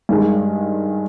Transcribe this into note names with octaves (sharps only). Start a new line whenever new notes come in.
G2 D#3 G#3